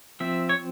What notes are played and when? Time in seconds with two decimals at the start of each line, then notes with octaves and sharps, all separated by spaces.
0.20 F3 C4 E5
0.49 C#5